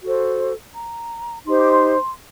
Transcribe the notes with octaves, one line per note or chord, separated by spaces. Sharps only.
F#4 A4 C5
A#5
D#4 G4 C5 C6
D6
C6